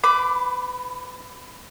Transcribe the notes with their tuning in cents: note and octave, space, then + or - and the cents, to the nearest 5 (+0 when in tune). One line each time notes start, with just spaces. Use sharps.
B4 +30 B5 +0 D6 +0